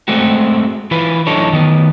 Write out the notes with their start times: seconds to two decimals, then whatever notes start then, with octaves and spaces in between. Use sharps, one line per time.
0.08 G#3 A3 C4 F#4
0.91 E3 F4 B4
1.27 E3 F#3 D4 D#4 A4 C#5
1.53 D#3 B3